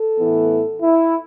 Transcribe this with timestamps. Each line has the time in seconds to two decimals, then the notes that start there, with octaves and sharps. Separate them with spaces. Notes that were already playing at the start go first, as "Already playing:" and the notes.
Already playing: A4
0.17 A2 E3 B3 E4
0.82 E4